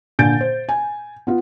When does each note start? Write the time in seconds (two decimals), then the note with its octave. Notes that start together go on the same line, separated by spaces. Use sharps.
0.19 A#2 D3 G#5 G6 A6 D7
0.41 C5
0.69 G#5
1.27 B3 F4